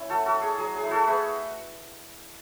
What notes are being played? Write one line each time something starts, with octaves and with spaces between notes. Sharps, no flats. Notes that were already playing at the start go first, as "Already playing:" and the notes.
Already playing: C#4 E4
A3 F#4 A4
F#4 A4
D4
G#4
F#3 G#4
G#4
A3 E4
F#4 A4
A3 G#4 B4